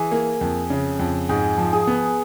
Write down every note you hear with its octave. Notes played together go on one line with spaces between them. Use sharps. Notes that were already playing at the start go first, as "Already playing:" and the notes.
Already playing: E3 G#4
A#3
F2
C#3
F2
G#2 G#4
F3
G#4
B3